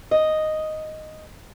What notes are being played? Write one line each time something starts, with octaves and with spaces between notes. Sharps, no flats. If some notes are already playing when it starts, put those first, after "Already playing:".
D#5